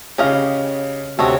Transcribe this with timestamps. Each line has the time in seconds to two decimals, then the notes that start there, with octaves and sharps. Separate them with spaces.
0.18 C#3 C#4 G4 D#5 F5
1.19 D2 C3 C4 F#4 A4 C#5 D#5